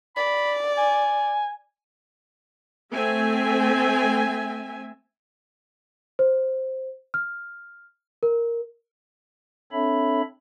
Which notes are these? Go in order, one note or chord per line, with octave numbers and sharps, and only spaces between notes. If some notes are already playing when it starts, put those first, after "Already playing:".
D5 B5
G#5
A3 C4 E5 G#5
C5
F6
A#4
C4 D4 A4 C#5 E5 B5